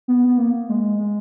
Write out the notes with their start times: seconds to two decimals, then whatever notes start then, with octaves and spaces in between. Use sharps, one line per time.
0.08 B3
0.27 B3
0.38 A#3
0.69 G#3
0.99 G#3